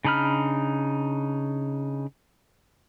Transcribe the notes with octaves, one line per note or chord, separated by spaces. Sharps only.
C#3 D4 D#4 B5 F6